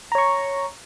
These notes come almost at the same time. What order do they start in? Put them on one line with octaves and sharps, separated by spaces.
A#5 C#5 C#6